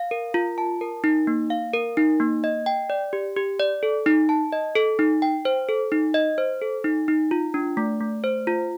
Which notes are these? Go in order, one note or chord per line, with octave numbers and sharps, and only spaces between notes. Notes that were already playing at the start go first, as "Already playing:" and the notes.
Already playing: F5
A#4
F4
A5
A#4
D#4
A#3
F5
A#4
D#4
A#3
D#5
G5
D5
G4
G4
D5
A4
D#4
A5
D#5
A4
D#4
G5
C5
A4
D#4
D#5
C5
A4
D#4
D#4
F4
D4
A3
A3
C5
F4